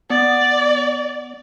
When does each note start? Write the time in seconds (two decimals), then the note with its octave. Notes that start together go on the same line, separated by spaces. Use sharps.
0.10 B3 D5